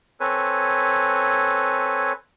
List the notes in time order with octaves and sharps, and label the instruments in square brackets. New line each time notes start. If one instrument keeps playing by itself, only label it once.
[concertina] C4 A4 B4 C#5 G#5